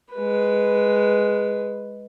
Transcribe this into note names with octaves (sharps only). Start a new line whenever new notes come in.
G#3 B4